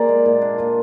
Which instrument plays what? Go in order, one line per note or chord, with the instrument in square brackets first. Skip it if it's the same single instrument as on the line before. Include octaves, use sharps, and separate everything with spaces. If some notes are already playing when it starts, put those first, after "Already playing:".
Already playing: [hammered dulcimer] A#3 F4 G#4 [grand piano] D5
[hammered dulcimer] G#3
A#2
D4
F4